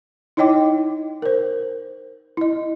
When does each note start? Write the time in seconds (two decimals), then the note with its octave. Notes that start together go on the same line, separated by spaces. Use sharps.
0.37 D#4 E4 C#5 D#5 G5 D6
1.22 A#4 C5
2.37 E4 D#5